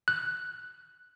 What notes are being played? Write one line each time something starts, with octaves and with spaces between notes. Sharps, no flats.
F#6